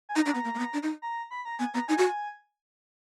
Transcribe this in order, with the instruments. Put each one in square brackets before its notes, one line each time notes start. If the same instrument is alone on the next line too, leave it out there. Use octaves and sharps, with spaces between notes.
[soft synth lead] G#5
[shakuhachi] D#4 [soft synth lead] A#5
[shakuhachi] D4
B3
A#3
A#3
B3
D4
D#4
[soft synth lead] A#5
B5
A#5
[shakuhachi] B3 [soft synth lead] G#5
[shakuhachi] B3 [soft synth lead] A#5
[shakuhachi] D#4 [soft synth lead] G#5
[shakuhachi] F#4